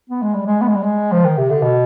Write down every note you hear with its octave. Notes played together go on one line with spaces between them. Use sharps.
B3
G#3
G3
G#3
B3
G#3
G3
G#3
F3
D#3
C3
D3
B2